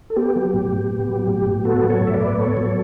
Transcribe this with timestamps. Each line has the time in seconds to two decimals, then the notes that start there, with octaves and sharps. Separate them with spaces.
0.10 A4
0.16 B3 G4
0.36 F#3
0.54 A2
0.72 A2
0.91 B3
1.09 F#3
1.28 A2
1.46 A2
1.64 B3 F#4 A4
1.84 F#3
1.89 A4 C#5
2.01 A2
2.07 E5
2.13 B4 D5
2.20 A2
2.38 B3 A4 C#5
2.57 F#3